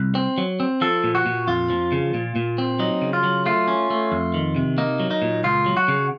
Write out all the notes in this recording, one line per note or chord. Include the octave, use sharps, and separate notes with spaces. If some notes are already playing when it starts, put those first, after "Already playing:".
Already playing: C2
C4
F#3
C4
F3 A4
A#2
F#4
A#2
F2 F4
F3
C#3
A#2
A#2
C4
F#3 D#4
C#3
F4
F#3
A3 F4
C#4
A3
F2
D#3
C3
A#3 D#4
F#3
D#4
A#2
C#2 F4
F#3
F#4
C#3